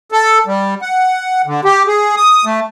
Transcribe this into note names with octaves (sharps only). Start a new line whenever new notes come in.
A4
G3
F#5
D3
G4
G#4
D#6
A3